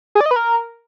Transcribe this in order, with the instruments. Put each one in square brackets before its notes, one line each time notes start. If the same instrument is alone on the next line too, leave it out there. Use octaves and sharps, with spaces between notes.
[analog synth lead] G#4
D5
D#5
B4
A#4